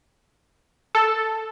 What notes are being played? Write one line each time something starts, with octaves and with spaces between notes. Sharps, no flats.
A4